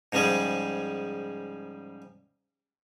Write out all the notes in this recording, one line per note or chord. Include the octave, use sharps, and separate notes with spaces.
G#2 C#3 F3 G3 G#4